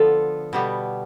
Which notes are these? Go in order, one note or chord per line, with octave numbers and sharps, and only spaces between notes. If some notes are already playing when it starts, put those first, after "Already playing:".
Already playing: D3 F3 B3 F4 A4
B2 G3 B3